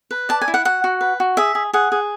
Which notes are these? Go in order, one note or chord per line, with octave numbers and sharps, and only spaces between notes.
B4
D5 A5
G#5
E4
F#5
F#4 F#5
F#4
B4
F#4
G#4 E5
G#4
G#4 F#5
G#4